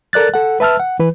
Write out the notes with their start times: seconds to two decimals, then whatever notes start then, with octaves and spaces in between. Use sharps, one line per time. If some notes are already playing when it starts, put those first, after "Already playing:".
0.13 A4 A#4 D5 F#6 A6
0.34 A4 F#5
0.60 B4 E5 A5 E6 F6
0.80 F#5
0.99 E3 B4